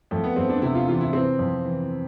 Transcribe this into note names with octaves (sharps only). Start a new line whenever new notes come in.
F2 A3
B3
F2 C4
D4
C3 E4
F4
E3 F4
E4
E3 C4
F2
E3